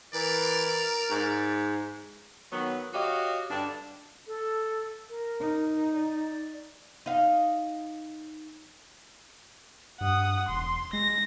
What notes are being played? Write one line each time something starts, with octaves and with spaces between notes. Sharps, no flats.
E3 A#4 D5
G#2
D#3 F#3 B3
F#4 G4 C#5 D#5 F5
G2 D3 D4
A4
A#4
D#4
D5
D#4 F5
G2 F#5 D#6
E1 C6
G#3 A#6